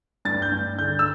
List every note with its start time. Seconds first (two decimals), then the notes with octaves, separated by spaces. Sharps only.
0.25 G2 A6
0.42 G6
0.52 G2
0.78 D3 G6
0.99 E6